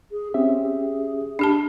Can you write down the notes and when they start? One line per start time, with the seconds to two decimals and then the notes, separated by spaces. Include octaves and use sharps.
0.12 G#4
0.34 C4 C#4 G4 E5
0.62 G#4
1.39 D4 G4 A5